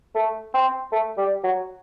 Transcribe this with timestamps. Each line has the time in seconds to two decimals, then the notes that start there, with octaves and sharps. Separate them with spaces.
0.15 A3
0.54 C4
0.92 A3
1.17 G3
1.44 F#3